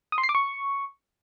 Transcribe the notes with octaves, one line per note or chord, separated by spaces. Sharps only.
D#6
C6
C7
D6
C#6